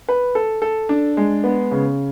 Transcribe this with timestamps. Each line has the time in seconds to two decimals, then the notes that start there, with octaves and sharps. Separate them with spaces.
0.09 B4
0.35 A4
0.62 A4
0.89 D4
1.17 G#3
1.44 B3
1.71 C#3